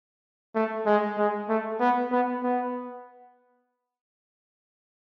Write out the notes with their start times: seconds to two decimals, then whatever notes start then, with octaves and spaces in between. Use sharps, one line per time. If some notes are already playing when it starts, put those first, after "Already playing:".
0.55 A3
0.86 G#3
1.18 G#3
1.49 A3
1.80 B3
2.12 B3
2.43 B3